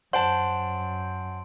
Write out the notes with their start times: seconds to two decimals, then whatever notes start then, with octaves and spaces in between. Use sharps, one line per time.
0.13 F#2 C5 F#5 A5 C6 D7 F#7